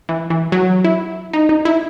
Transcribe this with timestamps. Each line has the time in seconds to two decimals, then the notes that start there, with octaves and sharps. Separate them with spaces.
0.09 E3
0.30 E3
0.52 F#3
0.84 E4
1.33 D#4
1.49 D#4
1.65 E4